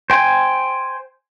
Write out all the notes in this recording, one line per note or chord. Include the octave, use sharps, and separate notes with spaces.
C5 G5 G#5